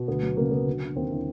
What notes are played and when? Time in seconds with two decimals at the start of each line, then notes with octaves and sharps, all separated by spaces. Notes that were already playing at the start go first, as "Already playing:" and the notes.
Already playing: B2
0.08 D2 B3
0.23 F#3
0.37 C#3 A#3
0.51 F#3 B3
0.67 D3
0.82 D3
0.96 D#2 C4
1.11 D3 E4